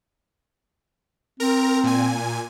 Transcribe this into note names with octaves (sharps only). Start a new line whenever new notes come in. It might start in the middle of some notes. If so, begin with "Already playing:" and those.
C4 A#4 A#5
A#2 G#5